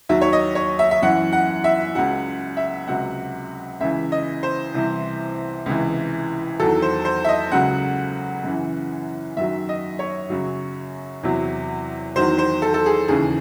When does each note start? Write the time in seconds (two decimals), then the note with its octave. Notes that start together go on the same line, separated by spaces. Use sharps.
0.09 D#2 D#3 F#3 E5
0.21 C#5
0.33 D#5
0.55 C#5
0.79 E5
0.91 E5
1.02 F#2 E3 F#5
1.33 F#5
1.64 E5
1.95 C#2 C#3 F#3 F#5
2.57 E5
2.88 C#2 C3 F#3 F#5
3.80 C#2 C#3 E3 E5
4.12 D#5
4.43 C5
4.74 C2 C3 E3
5.66 C#2 C3 E3
6.60 E2 D#3 F#3 A4
6.82 C5
7.05 C5
7.25 E5
7.28 D#5
7.52 C#2 C#3 F#3 F#5
8.44 F#2 C#3 E3
9.37 F#2 D#3 F#3 E5
9.69 D#5
9.99 C#5
10.30 F#2 C#3 F#3
11.23 E2 C3 F#3
12.16 E2 D#3 F#3 C5
12.38 C5
12.62 A4
12.74 A4
12.86 G#4
13.08 D#2 C#3 E3 G#4